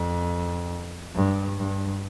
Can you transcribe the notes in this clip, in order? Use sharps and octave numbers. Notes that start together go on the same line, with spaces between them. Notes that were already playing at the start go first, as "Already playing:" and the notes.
Already playing: F2
G2
G2